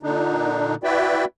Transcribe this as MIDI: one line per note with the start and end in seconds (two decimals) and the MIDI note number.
0.03 0.75 46
0.03 0.75 50
0.03 0.75 62
0.03 0.75 63
0.84 1.25 64
0.84 1.25 66
0.84 1.25 71
0.84 1.25 74
0.84 1.25 76
0.84 1.25 79